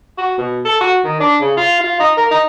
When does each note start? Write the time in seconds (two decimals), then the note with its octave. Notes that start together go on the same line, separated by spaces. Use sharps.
0.18 F#4
0.38 B2
0.65 A4
0.81 F#4
1.04 D#3
1.20 D4
1.40 C#3
1.57 F4
1.81 F4
1.99 D#4
2.17 A#4
2.31 D#4